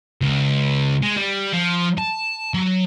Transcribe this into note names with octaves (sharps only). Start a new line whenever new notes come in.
C#2
G#3
G3
F3
A5
F#3